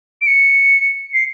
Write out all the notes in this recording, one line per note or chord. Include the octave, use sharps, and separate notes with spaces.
D7
C#7
C7